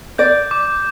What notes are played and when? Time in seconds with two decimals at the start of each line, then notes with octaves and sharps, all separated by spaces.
0.18 D5 G6
0.51 D6